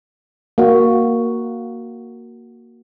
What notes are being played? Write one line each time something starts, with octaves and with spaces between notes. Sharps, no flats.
A#3 F#4